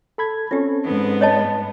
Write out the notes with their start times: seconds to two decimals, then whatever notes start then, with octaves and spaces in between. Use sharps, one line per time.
0.18 A4 B5 G#6
0.51 C4 C#4 F4 G4 A4
0.84 G#2 B3
1.21 C#5 D#5 A5